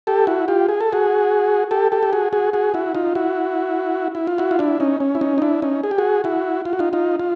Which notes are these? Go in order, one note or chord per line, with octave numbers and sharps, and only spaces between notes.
G4 A4
E4 F#4
F4 G4
G#4
A4
F#4 G#4
G4 A4
G4 A4
G4
F#4 G#4
F#4 G#4
F#4 G#4
E4 F#4
D#4 F4
E4 F#4
E4
F4
E4 F#4
F4
D4 E4
C#4 D#4
C#4
E4
C#4 D#4
D#4
D4 E4
C#4 D#4
G#4
G4
F#4 G#4
E4 F#4
F4
F#4
D#4 F4
D#4 F4
F4